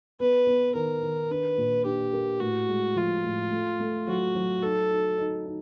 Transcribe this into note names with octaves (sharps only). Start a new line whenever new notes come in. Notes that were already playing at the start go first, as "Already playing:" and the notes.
B3 B4
B3
D#3 A#4
D#3
D4 B4
A#2
D4 G4
A#3
A2 F#4
G#3
F3 F4
A2
A3
A3
F#3 F#4
F#3
D#4 A4
D#4
D#4
D#4